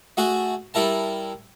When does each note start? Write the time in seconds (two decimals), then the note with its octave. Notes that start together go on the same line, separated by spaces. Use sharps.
0.17 A3 F#4 G#4
0.74 G3 E4 A#4 A5